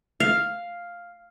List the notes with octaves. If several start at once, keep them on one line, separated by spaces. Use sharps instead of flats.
F5